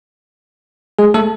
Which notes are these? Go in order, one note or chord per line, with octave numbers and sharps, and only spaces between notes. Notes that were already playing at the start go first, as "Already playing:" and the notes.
G#3 G#4
A3 A4